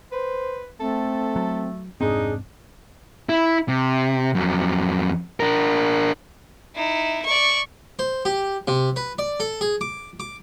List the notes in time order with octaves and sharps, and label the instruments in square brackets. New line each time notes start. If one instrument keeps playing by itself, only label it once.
[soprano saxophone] B4 [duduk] C5
[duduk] A3 [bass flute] C4 [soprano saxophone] A4
[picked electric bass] F#3
[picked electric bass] F1 G#2 C4 [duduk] D4 [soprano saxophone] D#4 [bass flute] G#4
[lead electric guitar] E4
C3
F2 F#3
D4 A#4
[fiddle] D#4 E4
D5 C#6
[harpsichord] C5
G4
C3
B4
D5
A4
G#4
D6
D6